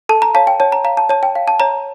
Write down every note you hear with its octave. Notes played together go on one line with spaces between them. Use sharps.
A4 A5
A#5
C#5 F5 A5
G5
C#5 A5
A#5
F5 A#5
A5
C#5 A5
G5
F5
A5
C#5 A#5